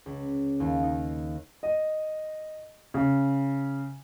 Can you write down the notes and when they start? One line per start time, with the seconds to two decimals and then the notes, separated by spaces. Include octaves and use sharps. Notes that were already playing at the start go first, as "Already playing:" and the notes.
0.06 C#2
0.60 D#2
0.84 D#4
1.63 D#5
2.94 C#3